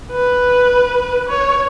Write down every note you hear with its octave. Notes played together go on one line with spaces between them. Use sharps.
B4
C#5